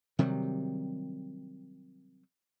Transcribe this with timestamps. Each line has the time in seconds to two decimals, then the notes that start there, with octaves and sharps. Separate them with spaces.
0.19 C3 D#3 F#3 G3